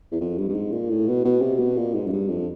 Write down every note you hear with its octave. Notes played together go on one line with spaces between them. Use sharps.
E2
F2
G2
G2
G#2
A#2
A2
B2
B2
C3
B2
A#2
G#2
F#2
G2
F2